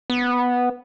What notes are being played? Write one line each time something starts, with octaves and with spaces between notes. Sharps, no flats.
B3